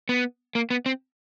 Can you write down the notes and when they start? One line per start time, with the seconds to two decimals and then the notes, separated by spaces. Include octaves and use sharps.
0.09 B3
0.55 A#3
0.70 B3
0.86 C4